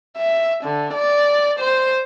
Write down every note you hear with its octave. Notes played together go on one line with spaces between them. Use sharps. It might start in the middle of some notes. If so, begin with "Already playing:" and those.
E5
D3
D5
C5